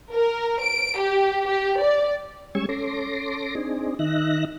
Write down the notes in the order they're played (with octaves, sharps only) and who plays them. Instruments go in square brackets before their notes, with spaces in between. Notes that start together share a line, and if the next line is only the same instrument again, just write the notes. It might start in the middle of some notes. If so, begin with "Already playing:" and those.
[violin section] A#4
D7
G4
G4
D5
[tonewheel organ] G3 G#3 C#4 C#6 E6 G#6
C#4 A4 C6 D6 A#6
C4 D4 D#4 G#4
D#3 D#4 E5 F#6 A#6